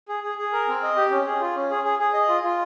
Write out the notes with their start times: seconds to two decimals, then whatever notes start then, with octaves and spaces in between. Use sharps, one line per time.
0.09 G#4
0.24 G#4
0.38 G#4
0.53 A#4
0.68 C4
0.83 D#5
0.96 G4
1.11 C#4
1.26 G#4
1.40 F4
1.56 C#4
1.71 G#4
1.84 G#4
1.99 G#4
2.13 D#5
2.29 F4
2.43 F4